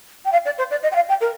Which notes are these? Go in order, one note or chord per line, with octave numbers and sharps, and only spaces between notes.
G5
F5
D5
C5
D5
D#5
G5
F5
G5
A#4